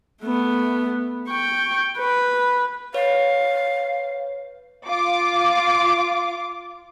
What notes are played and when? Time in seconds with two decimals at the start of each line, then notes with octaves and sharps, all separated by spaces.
0.22 A3 B3
1.28 G5 C#6
1.98 B4
2.94 B4 C#5 F5
4.88 F4 D6